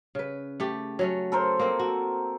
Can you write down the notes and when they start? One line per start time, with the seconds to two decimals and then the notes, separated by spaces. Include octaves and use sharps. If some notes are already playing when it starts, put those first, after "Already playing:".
0.15 C#3 B4
0.60 A3 G4
0.99 F#3 A3 C#4
1.32 A4 A#4 C5
1.60 A#3 C4
1.79 F#4